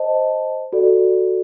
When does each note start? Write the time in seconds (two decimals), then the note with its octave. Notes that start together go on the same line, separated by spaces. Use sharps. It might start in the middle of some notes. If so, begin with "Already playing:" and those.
Already playing: C5 D#5 A5
0.73 F#4 A4 D5